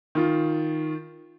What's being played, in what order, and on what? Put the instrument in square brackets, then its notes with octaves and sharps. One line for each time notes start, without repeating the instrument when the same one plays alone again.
[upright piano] D#3 F4